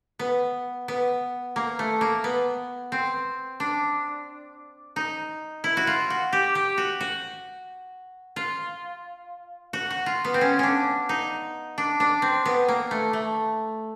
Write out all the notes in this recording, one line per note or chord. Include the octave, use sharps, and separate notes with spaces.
B3
B3
A#3
A3
A#3
B3
C4
D4
D#4
E4
F#4
F4
F#4
G4
G4
F#4
F#4
F4
F#4
F#4
F4
B3
C4
C#4
C#4 D4
D#4
D4
D4
C4
B3
A#3
A3
A3